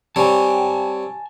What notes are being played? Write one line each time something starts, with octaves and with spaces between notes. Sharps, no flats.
G3 C4 C#5 G#5 A5